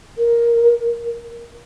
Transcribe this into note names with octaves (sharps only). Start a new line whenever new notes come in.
A#4